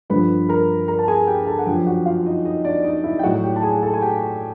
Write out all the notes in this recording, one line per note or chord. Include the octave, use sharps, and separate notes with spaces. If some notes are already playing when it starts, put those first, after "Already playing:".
G2 D3 F3 B4 B5
A#4 A#5
A#4 A#5
A5
G#4 G#5
G4 G5
A4 A5
F#5
F#2 D3 F3 G4 G5
F#4 F#5
F4 F5
D#4 D#5
D#4 D#5
D4 D5
D#4 D#5
E4 E5
G5
A2 F#3 F#4 F#5
G4 G5
A5
G#4 G#5
A4 A5
G#5
G4 G5